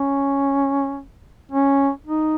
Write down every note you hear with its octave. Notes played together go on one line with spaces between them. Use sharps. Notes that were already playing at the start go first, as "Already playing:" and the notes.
Already playing: C#4
C#4
D#4